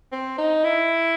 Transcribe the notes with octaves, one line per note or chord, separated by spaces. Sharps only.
C4
D#4
E4